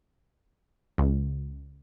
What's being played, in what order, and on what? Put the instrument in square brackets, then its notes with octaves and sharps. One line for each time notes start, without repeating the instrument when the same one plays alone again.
[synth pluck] C#2